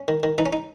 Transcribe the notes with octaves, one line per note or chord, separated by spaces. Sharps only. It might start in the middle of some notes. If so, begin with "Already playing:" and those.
Already playing: C#4
D#3
D#3
E3 D#4
C#4
D#4